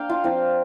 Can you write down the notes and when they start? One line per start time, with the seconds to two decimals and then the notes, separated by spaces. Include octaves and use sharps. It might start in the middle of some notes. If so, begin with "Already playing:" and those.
Already playing: A#3 D4 F5 G5
0.09 F4
0.24 F3 C4 F4